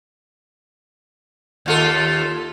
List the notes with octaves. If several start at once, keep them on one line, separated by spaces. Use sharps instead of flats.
D#2 F4 A4